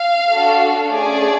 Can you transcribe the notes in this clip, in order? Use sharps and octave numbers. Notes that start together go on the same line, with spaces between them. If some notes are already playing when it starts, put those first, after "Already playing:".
Already playing: F5
D4 F#4 A4
A3 C#4 G#4 D5